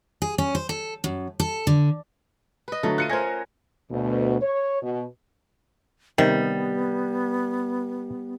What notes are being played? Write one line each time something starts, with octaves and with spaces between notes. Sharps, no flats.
G#4
C#4
C5
A4
F#2
A4
D3
B4 D#5
D3 F#3 A3
F4 F#6 C#7 D#7
C#4 A#4 C5 G#6 A#6
D2 B2
C#5
B2
C3 D#3 G3 B3